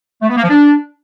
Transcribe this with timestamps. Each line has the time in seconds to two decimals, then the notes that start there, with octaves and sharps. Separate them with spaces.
0.22 A3
0.29 B3
0.36 A#3
0.43 F3
0.50 D4